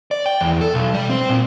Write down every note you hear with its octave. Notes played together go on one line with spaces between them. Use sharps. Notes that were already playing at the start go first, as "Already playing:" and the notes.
D5
G5
E2
A4
B1
G3
C4
A#2